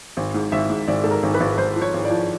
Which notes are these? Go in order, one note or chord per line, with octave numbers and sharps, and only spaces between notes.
G#1
G#2
G#1 E5
G#2
G#1 D5
G#2 A4
A#4
G#1
B4
G#1
G#1 C5
F3
C#5
G#1
D5
F3